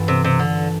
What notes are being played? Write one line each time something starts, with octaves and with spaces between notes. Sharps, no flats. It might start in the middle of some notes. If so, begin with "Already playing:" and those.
Already playing: G2 E3 B3 F4 A4
C3
C3
D3